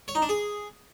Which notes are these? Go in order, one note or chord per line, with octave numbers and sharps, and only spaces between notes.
C#5
D#4
D4
G#4